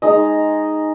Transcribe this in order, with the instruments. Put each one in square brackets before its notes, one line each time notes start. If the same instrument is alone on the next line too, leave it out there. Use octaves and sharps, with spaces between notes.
[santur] G#3 D#4 D#5